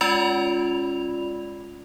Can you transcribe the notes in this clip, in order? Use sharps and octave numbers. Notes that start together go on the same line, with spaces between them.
G#3 C#4 F4 D5 B5 F7